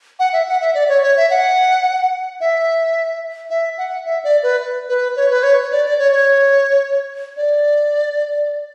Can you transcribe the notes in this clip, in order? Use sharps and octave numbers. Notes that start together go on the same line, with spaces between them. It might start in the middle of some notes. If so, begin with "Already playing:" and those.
F#5
E5
F#5
E5
D5
C#5
C#5
E5
F#5
E5
E5
F#5
E5
D5
B4
B4
C#5
B4
C#5
D5
D5
C#5
C#5
D5